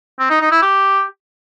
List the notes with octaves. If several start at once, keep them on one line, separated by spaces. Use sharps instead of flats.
C4
D#4
D#4
E4
G4